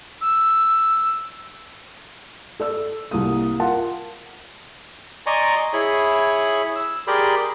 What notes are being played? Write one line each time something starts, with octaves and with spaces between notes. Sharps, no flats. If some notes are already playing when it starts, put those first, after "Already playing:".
E6
A4 D5 E6
C2 A#3 D#6
F4 A#4 F#5 A5
D5 D#5 G#5 A#5 C6 C#6
E4 G#4 C#5 B5
E6
G4 G#4 A#4 D5 B5 C6